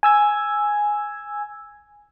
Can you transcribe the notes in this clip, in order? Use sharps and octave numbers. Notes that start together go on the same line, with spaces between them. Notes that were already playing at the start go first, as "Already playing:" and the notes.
G#5 E6 G#6